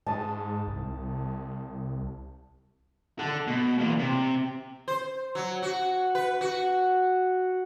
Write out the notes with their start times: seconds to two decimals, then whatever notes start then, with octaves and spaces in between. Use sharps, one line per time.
0.07 G#2 A5 D#6
0.67 C2
3.19 A4 F#5
3.47 B2
3.79 A#2 E3
3.99 C3
4.88 C5
5.35 F#3
5.63 F#4
6.15 B4
6.41 F#4